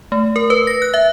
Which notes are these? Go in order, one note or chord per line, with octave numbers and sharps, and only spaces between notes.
A3
A#4
B4
A#6
F#6
E5